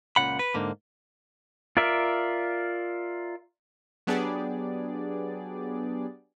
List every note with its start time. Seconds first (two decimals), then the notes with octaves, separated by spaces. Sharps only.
0.16 C#2 A#2 C#3 F#5 B5
0.39 B4
0.54 G#2 D3 A#3
1.77 F4 A#4 D5 E5
4.07 F#3 B3 D4 G4 G#4 D5